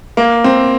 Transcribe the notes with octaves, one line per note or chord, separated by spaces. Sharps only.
A#3
C4